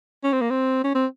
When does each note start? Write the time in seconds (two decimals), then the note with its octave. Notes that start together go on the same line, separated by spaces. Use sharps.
0.24 C#4
0.33 C4
0.41 A#3
0.51 C4
0.84 C#4
0.95 C4